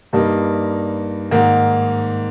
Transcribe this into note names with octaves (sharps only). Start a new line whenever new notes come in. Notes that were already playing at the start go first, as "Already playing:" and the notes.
G2 G3 A#3 D#4
G#2 D#3 A#3